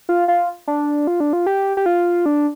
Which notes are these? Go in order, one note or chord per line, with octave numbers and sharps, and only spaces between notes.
F4
F4
D4
F4
D4
F4
G4
G4
F4
D4